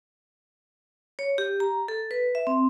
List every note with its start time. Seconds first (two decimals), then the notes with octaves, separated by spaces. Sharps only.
1.19 C#5
1.38 G4
1.60 A#5
1.88 A4
2.11 B4
2.35 E5
2.47 C4